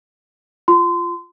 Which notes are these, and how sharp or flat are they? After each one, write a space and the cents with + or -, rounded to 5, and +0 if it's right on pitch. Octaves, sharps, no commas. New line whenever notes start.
F4 -10 C6 -25